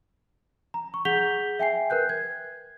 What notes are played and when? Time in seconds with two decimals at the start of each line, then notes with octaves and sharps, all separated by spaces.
0.74 A#5
0.94 C#6
1.05 G#4 F#5 G6 B6 F7 G7
1.59 E5 G5 G#5 C7
1.90 A#4 B4 F#6 G6
2.09 G#6